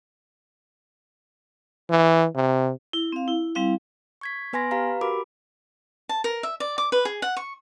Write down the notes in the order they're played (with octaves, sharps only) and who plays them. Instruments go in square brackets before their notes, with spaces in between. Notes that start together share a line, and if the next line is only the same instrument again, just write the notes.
[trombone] E3
C3
[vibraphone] E4
C4 F5
E4
G3 C4 E4 F5
[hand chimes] C#6 G#6 B6
B3 B4 G#5 C6 A#6
G4 B4 F5 A#5
F#4 G4 A#4 B5 D6
[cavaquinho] A5
A#4
E5
D5
D6
B4
G#4
F#5
C#6